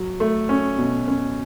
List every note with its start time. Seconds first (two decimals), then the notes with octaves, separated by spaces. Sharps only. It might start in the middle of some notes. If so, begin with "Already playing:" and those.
Already playing: F#3
0.20 A3
0.49 C#4
0.79 B2
1.08 C#4